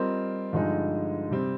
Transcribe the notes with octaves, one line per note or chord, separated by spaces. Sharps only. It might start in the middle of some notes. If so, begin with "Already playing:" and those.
Already playing: G3 C4 F4 A#4 D#5
G2 D3 F3 G#3 D#4
C3 G3 C4